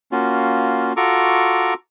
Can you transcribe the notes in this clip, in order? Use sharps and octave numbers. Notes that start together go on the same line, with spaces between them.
A#3 C#4 F4 F#4
F4 F#4 A4 A#5 C#6 D6